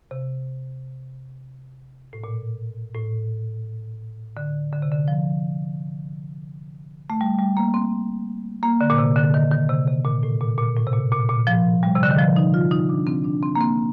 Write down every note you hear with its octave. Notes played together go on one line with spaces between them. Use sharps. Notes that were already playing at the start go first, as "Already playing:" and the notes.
C3
A2
A#2
A2
D3
D3
C3
D3
F3
A3
G3
G3
A#3
C4
A#3
D3
A#2
C3
D3
D#3
D#3
C3
C3
A#2
A2
A#2
A#2
A2
C3
A#2
A#2
A#2
F3
G3
C3
D3
D#3
F3
D#4
F4
D#4
D4
C4
D4
C4
A#3
C4